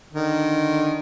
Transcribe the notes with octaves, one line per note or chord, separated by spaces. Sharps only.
D3 D#3